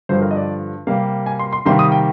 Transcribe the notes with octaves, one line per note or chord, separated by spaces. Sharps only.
G2 D3 F3 C5
A#4
D#5
D5
C3 G3 A#3 F5
G#5
C6
C6
C3 D#3 G3 A#3 C6
D#6
G5